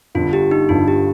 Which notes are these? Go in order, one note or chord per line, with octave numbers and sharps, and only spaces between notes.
G1 G2 D3 F4
G4
D#4
G1 G2 D3 F4
G4